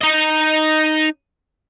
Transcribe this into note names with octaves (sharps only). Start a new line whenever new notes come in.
D#4 D#5